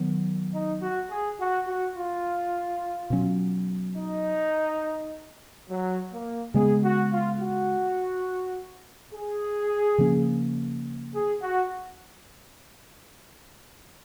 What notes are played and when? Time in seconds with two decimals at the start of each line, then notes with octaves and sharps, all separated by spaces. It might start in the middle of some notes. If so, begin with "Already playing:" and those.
Already playing: D#3 F#3 B3
0.53 D#4
0.81 F#4
1.11 G#4
1.39 F#4
1.67 F#4
1.97 F4
3.10 B2 F#3 C#4
3.97 D#4
5.69 F#3
6.12 A#3
6.54 C#3 G#3 B3 G#4
6.84 F#4
7.12 F4
7.41 F#4
9.13 G#4
9.98 C#3 F3 A#3 C#4
11.14 G#4
11.42 F#4